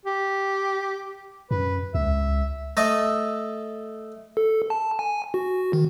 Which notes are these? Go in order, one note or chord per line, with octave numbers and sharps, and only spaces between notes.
G4
F#2 B4
C#2 E5
A3 A4 D#5
A4
A5
G#5
F#4
D#3